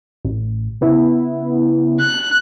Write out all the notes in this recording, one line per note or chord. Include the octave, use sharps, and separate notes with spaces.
A1
C#3 B3 E4
F#6